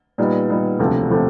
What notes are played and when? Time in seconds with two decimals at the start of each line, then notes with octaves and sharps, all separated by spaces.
0.18 A#2 G3 B3 D#4
0.49 A#2 G3 B3 D#4
0.79 E1 D2 C3 F3 A3
1.10 C3 F3 A3